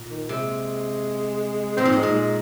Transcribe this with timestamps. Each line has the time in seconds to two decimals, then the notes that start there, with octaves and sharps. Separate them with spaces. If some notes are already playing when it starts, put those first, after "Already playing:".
Already playing: A#2
0.10 D#3
0.29 C3 G#3
1.77 A#2 C4
1.85 G#2
1.93 A#2 G#3
2.03 A#2
2.15 G#3